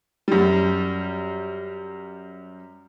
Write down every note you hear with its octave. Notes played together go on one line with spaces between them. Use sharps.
F#2 G3